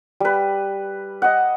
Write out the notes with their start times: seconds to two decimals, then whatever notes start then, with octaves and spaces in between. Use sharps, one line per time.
0.20 G3 B4
1.22 D#5 F#5